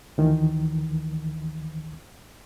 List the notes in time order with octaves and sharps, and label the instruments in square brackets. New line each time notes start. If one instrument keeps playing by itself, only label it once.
[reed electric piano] D2 D#3 E3